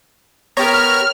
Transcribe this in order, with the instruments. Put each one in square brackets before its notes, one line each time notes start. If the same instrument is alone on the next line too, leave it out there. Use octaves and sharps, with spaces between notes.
[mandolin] B3 G4 A#4 [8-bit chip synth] C#5 A#5 [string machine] F6